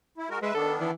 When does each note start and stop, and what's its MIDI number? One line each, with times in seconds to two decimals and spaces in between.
0.18 0.29 64
0.30 0.39 56
0.30 0.39 66
0.30 0.39 70
0.42 0.50 56
0.42 0.54 71
0.42 0.54 76
0.54 0.91 51
0.54 0.91 59
0.54 0.91 62
0.54 0.75 69
0.80 0.92 52